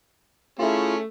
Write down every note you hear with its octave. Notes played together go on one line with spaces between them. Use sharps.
A3 C#4 E4 F4 G#4